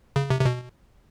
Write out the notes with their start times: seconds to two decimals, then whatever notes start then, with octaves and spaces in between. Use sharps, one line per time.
0.16 C#3
0.30 C3
0.41 C3
0.45 B2